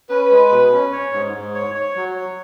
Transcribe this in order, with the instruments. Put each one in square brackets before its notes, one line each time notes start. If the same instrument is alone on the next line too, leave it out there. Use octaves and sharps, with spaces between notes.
[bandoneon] C#4 [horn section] B4
[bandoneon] G#3
B2
C#4
C#5
G#2
G#2
C#5
C#5
F#3
C#5